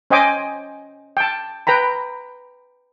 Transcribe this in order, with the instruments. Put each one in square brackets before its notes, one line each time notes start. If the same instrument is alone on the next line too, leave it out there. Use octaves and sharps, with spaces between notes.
[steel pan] C#4 C5 D#5 G5 G#5 D6
G5 A5
B4 G5 A#5 B5